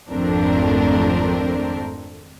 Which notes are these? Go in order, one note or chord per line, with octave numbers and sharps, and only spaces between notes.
G#1 F2 A3 C4 D4 A#4